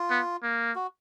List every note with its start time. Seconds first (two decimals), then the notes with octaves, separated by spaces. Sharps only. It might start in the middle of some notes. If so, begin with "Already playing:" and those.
Already playing: F4
0.10 B3
0.43 A#3
0.76 F#4